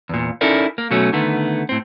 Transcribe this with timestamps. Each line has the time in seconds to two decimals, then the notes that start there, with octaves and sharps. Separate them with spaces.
0.09 E2 A#2
0.41 C#4 D#4 E4 A4 A#4 D5
0.78 A#3
0.91 B2 F#3 A3 C#4
1.13 D3 D#3 A3 B3
1.69 A2 C4